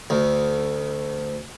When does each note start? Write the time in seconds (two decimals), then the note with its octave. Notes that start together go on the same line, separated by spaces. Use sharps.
0.10 D2